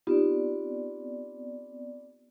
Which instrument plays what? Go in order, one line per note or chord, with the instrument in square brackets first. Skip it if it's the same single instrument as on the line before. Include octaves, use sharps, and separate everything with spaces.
[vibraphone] B3 C4 D5 [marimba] D#4 F4 G4